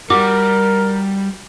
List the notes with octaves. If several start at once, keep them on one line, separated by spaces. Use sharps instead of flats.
G3 F#4 A#4 D6